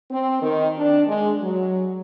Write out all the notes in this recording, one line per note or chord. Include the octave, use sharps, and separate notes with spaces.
C4
D#3
D4
G#3
F#3